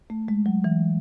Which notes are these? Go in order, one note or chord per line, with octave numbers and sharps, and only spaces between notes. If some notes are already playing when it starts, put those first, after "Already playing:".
A3
G#3
F#3
E3